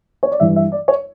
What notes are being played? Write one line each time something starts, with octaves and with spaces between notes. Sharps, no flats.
C#5
D5
G2 E3 E5
E5
D5
C#5